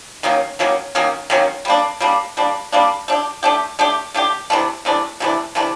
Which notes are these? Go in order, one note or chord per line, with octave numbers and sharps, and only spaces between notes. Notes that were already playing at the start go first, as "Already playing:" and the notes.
D#3 F#3 A#3 C#4
D#3 F#3 A#3 C#4
D#3 F#3 A#3 C#4
D#3 F#3 A#3 C#4
G3 A#3 D4
G3 A#3 D4
G3 A#3 D4
G3 A#3 D4
A3 D4 G4
A3 D4 G4
A3 D4 G4
A3 D4 G4
C3 E3 A3 D4
C3 E3 A3 D4
C3 E3 A3 D4
C3 E3 A3 D4